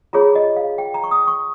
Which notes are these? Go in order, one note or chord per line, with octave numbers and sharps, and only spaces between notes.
F4 G#4 C#5 A#5
D#5
F5
G5
A#5
C#6
D#6
C#6